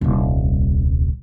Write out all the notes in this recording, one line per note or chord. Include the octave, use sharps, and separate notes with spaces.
D#1 C2